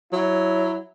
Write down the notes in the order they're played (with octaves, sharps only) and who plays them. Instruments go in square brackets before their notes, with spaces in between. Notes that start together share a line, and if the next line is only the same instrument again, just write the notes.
[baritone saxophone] F#3 [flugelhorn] E4